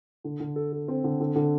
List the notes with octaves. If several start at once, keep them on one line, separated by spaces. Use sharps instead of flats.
D3
D3
A4
A4
C4
D3
D3
D3